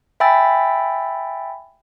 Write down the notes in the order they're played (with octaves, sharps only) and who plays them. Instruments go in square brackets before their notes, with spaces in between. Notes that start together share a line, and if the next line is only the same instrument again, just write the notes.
[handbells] E5 G5 G#5 B5 E6 A6